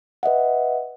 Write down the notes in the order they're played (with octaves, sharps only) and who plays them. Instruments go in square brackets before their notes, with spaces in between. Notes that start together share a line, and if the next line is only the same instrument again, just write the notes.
[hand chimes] B4 D#5 E5 F#5